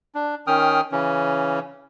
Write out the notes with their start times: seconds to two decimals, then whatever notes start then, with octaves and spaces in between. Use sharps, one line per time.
0.15 D4
0.47 D#3 C#4 G5 D#6 F6
0.92 C#3 E3 C#4